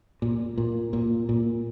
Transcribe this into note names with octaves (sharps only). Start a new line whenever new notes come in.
A#2
A#2
A#2
A#2